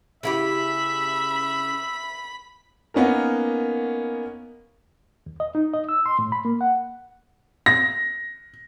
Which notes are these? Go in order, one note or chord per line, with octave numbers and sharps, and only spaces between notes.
C#3 E4 G4 E5 B5
A#3 B3 C#4 D#4 A#4
D#2
D#5
D#4
D#5
E6
C6
A2
B5
A#3
F#5
A#6